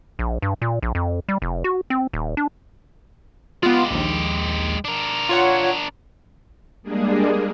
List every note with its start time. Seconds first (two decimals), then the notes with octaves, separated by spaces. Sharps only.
0.19 A#1
0.42 G2
0.62 A#2
0.82 A#1
0.95 F2
1.29 G3
1.42 F1
1.64 F#4
1.90 C4
2.13 D#1
2.37 D4
3.63 G#3 B3 F4 G4
3.91 A#1 D#2
4.85 D4 A#4
5.29 F4 C#5 F#5
6.82 G3 G#3 A#3 D4 G#4